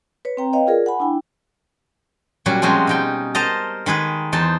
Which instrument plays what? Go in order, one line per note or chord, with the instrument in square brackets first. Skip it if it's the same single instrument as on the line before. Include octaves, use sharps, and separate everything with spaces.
[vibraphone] B4 C#5
C4 G5 A#5
B4 C#5 D#5 F5 G5
F4 G#4 A#4 D5
F#5 G#5 B5
D4 E4 G5
[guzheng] A#2 F#3 G3 C#4 F#4
F3 G3 G#3 C4 C#4 F#4
B2 D#4 G5
A#4 C5 D#5 A5 A#5
D#3 G#3 G#4 B4
E2 D#4 C5 A5